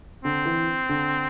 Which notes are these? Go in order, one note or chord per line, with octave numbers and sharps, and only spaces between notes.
D3 C4
E3
D3